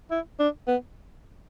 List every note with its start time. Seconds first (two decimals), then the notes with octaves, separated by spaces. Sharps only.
0.11 E4
0.40 D4
0.67 B3